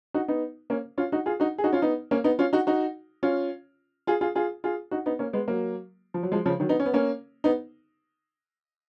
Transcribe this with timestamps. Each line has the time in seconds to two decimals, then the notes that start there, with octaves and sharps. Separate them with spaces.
0.14 D#4 F#4
0.28 B3 D#4
0.70 A#3 C#4
0.98 C#4 F4
1.12 D#4 F#4
1.26 F4 G#4
1.40 D#4 F#4
1.58 G#4
1.64 D#4 F#4
1.73 C#4 F4
1.82 B3 D#4
2.11 A#3 C#4
2.24 B3 D#4
2.39 C#4 F4
2.53 D#4 F#4
2.67 D#4 F#4
3.23 C#4 F4
4.07 F4 G#4
4.21 F4 G#4
4.35 F4 G#4
4.64 F4 G#4
4.91 D#4 F#4
5.06 B3 D#4
5.19 A#3 C#4
5.33 G#3 B3
5.48 F#3 A#3
6.14 F3
6.23 F#3
6.32 F3 G#3
6.46 C#3 F3
6.60 D#3 F#3
6.69 B3 D#4
6.80 C#4
6.86 B3
6.94 A#3 C#4
7.44 B3 D#4